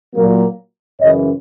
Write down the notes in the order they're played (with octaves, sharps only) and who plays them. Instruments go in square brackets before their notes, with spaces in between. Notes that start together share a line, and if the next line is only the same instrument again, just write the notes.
[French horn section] A#2 F#3 A#3
F#2 C#3 E3 C#5 D#5